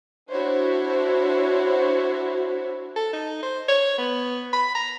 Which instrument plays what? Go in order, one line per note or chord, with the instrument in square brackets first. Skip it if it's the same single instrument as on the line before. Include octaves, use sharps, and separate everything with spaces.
[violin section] D4 E4 F#4 C5 C#5
[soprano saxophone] A4
D#4
C5
C#5
B3
B5
A#5